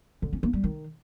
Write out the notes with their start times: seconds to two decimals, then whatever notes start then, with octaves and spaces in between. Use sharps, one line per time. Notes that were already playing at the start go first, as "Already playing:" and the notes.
0.22 D3
0.33 C#4
0.43 A#3
0.53 G3
0.64 D#3